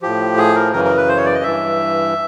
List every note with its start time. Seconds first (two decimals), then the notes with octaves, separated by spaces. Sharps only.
0.02 A2 F3 G4
0.38 G#4
0.55 A#4
0.73 F#2 C#3 E3 A#4
0.85 A#4
0.96 B4
1.08 C5
1.17 C#5
1.25 D5
1.35 D#5
1.43 G2 E3 E5